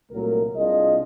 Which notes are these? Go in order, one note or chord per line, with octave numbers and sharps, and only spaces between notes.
C2 A#2 F#3 A3 A#4
C2 D4 F4 G#4 D#5